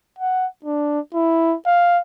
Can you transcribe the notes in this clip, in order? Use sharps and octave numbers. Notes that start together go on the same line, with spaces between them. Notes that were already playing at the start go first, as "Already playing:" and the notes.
F#5
D4
E4
F5